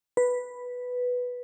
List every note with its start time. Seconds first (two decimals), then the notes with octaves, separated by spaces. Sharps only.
0.17 B4